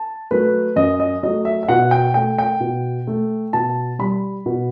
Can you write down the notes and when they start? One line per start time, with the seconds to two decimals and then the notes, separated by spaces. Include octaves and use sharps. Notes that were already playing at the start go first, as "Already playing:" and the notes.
Already playing: A5
0.31 F#3 A3 B4
0.76 F#2 D#5
1.00 D#5
1.23 F#3 A3 D#5
1.45 E5
1.63 E5
1.69 B2 F#5
1.91 G5
2.14 A3 G5
2.38 G5
2.60 B2
3.07 A3
3.53 B2 A5
3.99 G3 B5
4.46 B2